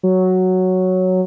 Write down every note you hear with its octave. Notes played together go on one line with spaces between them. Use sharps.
F#3